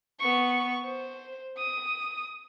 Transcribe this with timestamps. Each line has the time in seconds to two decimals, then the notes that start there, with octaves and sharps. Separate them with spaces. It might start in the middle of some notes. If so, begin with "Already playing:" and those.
0.20 B3 C#6
0.84 C5
1.58 D#6